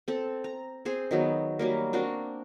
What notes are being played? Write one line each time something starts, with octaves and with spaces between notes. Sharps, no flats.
C4 A4
A#5
C4 G#4 C5
D#3 F#3 B3
F#3 G3 A#3
A#3 C4 D4 F#4